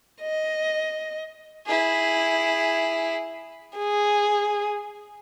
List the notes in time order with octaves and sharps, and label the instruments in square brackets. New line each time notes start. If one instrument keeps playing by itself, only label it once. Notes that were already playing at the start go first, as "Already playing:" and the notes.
[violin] D#5
E4 G#4
G#4